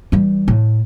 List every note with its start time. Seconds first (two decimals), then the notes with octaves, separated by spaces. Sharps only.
0.12 E3 G3
0.48 A2